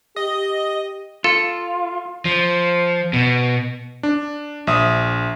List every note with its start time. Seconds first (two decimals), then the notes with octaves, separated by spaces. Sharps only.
0.16 G4 D#5
1.24 F4 A4
2.25 F3
3.13 B2
4.03 D4
4.67 A#1 E5 D#6